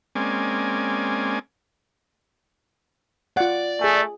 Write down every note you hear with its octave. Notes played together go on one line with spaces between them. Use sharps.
G#3 A#3 C4 C#4 D5 G#5
F4 D5 F#5
A3 G#4 G#5